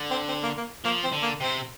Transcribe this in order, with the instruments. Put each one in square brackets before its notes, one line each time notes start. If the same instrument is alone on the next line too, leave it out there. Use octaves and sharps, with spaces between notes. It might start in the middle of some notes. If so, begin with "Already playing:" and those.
Already playing: [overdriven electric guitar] D3
[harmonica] C4
C4
A#3
A#3
[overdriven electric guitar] F3 [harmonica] A#3
[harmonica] C4
[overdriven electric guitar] D3
[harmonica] A#3
[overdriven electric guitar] C3 [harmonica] C4